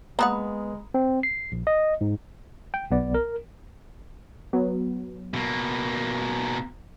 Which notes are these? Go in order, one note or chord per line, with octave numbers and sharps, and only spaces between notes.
G#3 A#3 B3 A#4 F#5 A#5 B5 D#6
C4
C7
A#1
D#5
G#2
G5
B1 B3 D5
A#4
F#3 B3
B2 A#3